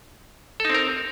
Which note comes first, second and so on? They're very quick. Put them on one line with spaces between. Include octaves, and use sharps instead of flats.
A4 D#4 C4 A#4